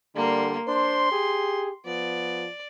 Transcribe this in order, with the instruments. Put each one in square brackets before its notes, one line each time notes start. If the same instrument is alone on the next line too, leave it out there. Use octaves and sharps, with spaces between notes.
[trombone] D3 [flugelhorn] G3 [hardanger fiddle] A#3 C6
[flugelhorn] D4 [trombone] C5 [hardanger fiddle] C6
[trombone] G4 [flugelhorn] G#4
[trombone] F3 [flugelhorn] B3 [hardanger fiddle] D5